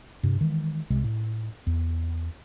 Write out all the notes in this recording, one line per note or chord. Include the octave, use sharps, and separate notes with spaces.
G2 C3
D#3 E3 G#3
C2 C3 G#3
A2
E2